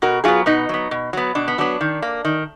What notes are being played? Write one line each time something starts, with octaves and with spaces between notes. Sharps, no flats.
B2 F#4 A#4
F#3 B3 F4 G#4
B2 B3 D#4
F#3 B3
B2
F#3 B3
B2 D4
B3
F#3 B3 D4
D#3
A#3
D#3